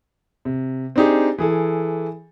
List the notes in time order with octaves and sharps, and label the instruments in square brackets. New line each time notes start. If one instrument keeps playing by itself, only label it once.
[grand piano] C3
C4 D4 D#4 G4 G#4
E3 G#4 A4